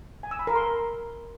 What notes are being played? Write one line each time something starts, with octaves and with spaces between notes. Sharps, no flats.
G#5
E6
B5
A#4
C6